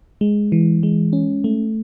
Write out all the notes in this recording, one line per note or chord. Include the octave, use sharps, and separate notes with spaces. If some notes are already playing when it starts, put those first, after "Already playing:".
G#3
E3
G#3
C#4
A3